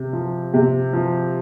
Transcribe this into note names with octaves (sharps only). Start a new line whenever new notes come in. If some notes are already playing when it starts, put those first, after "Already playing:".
Already playing: C3
F3
C3
F3